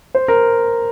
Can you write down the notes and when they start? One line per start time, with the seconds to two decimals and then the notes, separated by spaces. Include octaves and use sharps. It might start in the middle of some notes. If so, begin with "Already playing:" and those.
0.15 C5
0.28 A#4